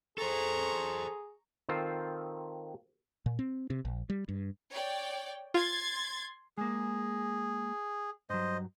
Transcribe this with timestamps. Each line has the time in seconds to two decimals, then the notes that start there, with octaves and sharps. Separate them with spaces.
0.18 G#4 A4 C5 A#5 C#6
1.69 D#3 C4 F4 A4 C5
3.26 A#2
3.39 C4
3.70 C3
3.85 A#1
4.10 G3
4.28 G2
4.70 C#5 D5 G5
5.54 F4 C6 G#6 A6
6.58 G#3 A#3 G#4
8.30 G2 F#3 C5 D#5